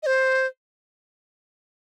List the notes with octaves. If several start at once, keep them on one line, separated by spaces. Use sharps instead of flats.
D#5
C5